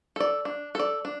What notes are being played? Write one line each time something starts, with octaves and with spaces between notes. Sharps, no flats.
A4 D5
D4
A4 D5
D4